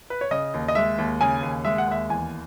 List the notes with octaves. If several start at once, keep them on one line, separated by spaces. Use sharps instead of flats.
B4
C#5
C#3 D#5
D#2
D#5
G#3 E5
D#2
C#3 G#5
D#2
G#3 E5
F#5
D#2 E5
E2 G#5